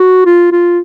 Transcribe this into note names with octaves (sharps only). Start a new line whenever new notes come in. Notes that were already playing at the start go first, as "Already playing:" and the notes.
Already playing: F#4
F4
F4